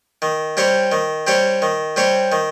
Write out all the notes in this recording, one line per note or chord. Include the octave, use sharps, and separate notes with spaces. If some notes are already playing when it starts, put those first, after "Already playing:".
D#3
G3 C4 G4 C#5
D#3
G3 C4 G4 C#5
D#3
G3 C4 G4 C#5
D#3